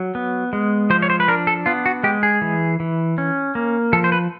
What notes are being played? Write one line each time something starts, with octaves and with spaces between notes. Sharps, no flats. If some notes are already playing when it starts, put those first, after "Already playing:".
Already playing: F#3
B3
G#3
F3 C5
C#5
C5
B4
D4 A#4
A4
B3 F4
F#4
G#3 G4
G#4
E3
E3
C#4
A#3
F3 A4
C5
B4